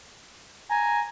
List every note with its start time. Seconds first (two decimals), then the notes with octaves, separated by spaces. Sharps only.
0.70 G#5 A#5